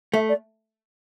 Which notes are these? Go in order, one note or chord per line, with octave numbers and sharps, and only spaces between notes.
A3 E5
D5